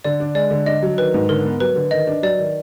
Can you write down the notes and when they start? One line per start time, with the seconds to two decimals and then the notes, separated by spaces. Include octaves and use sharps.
0.04 D3 D5
0.20 D4
0.35 G#3 D5
0.51 D3
0.66 D4 D#5
0.83 F#3
0.98 D#3 B4
1.14 G#2
1.29 D3 A#4
1.45 B3
1.60 F#3 B4
1.76 D3
1.91 D#3 D#5
2.07 D4
2.23 F#3 D5
2.39 D#3